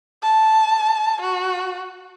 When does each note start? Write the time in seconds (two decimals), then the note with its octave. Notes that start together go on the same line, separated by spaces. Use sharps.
0.23 A5
1.22 F#4